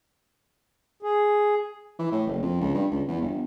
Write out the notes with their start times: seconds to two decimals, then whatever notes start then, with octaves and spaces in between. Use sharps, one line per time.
1.03 G#4
1.99 E3
2.12 A2
2.27 F#1
2.42 F2
2.61 C#2
2.74 G2
2.92 C#2
3.08 E2
3.22 G1